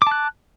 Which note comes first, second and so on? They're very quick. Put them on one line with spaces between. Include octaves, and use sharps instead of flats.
D6 A5 F#6